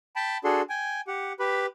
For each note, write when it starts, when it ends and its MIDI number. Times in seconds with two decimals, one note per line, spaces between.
0.16 0.38 79
0.16 0.38 81
0.16 0.38 83
0.44 0.62 62
0.44 0.62 66
0.44 0.62 68
0.44 0.62 69
0.44 0.62 84
0.69 1.01 79
0.69 1.01 80
1.07 1.33 67
1.07 1.33 78
1.39 1.66 67
1.39 1.66 71
1.39 1.66 83